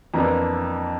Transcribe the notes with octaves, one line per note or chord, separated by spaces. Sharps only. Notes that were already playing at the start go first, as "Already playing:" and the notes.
F2 E3 A#3 D4 A#5